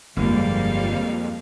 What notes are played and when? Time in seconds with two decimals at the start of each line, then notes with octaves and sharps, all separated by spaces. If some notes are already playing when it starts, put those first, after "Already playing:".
0.17 G1 F2 F3 G3 G#3 A#3 F5